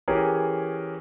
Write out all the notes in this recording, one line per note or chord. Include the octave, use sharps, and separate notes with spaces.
E3 C#4 G4 G#4 A#4